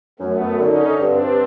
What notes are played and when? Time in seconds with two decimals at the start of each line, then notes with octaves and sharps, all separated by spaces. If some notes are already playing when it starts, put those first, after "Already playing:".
0.19 F#2 A3 B3
0.40 F#2
0.59 D3 C#4 D#4
0.79 D3
0.99 G2 C4 D4
1.19 G2